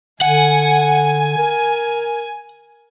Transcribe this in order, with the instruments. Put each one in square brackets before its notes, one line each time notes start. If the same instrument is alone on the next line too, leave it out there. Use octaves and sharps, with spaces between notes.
[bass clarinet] D3 [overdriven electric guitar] F#5 [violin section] G#5
[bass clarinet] A#4